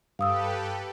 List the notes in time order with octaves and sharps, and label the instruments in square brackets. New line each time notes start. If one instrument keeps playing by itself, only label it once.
[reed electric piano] G2 [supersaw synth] G4 A4 B4 [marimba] F5 D#6 E6